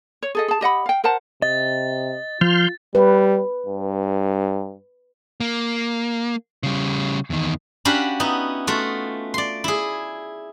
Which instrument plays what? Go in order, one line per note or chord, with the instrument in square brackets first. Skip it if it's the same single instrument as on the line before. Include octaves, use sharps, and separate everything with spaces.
[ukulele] C#5
G#4 A4 D#5
G#4 A5
G4 D#5 F#5 B5
F5 G5
A#4 C5 F#5 A5
[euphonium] C3 [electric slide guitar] D#5 [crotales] A6
[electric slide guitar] F3 [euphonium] F4 [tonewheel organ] C6 F6 G6
[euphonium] G3 [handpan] B4
[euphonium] G2
[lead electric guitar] A#3
C#3 G3
E2 D#3
[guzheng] C#4 D4 F#4 G4 F5 B5
B3 D#4 E4
A3 F4 F#4
D5 C6
E4 G#4